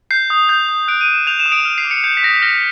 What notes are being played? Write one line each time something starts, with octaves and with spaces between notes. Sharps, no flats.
G6 C7
D#6
G6
D#6
F#6 D7
D#7
D#6
E7
G6 F7
E7
D#6
D7
F6
C7
D6
C#7
G6 C#7
B6
D#6 A#6
B6
F6 A#6